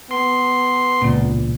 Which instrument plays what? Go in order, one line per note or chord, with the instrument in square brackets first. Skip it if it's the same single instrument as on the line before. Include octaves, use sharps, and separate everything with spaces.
[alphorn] B3 [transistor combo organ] C6
[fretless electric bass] E1 C#2 A#2